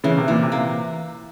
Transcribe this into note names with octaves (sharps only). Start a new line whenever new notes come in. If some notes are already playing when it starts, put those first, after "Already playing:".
C#3 E3
C3
A#2 E3
C3
A#3